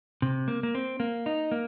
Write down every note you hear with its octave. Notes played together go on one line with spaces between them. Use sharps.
C3
A#3
A#3
C4
A#3
D#4
A#3